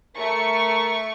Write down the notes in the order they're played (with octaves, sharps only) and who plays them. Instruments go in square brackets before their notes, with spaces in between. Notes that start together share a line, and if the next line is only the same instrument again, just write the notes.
[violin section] A3 C#6 [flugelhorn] A#4